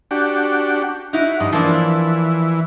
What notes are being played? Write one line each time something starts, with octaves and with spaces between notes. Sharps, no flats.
D4 F#4 G4
D#4 E4 F#4
G2 F3 D#4
E3 F3 A#3 D4